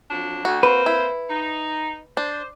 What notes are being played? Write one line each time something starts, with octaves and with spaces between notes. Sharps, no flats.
F2 F#3 D4
D2 F#4
A#3 C4 B4 C5
E4
D#4
D4 C5